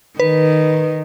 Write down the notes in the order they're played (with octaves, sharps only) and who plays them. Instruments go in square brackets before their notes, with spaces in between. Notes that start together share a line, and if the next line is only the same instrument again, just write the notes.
[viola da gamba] D#3 [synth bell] B4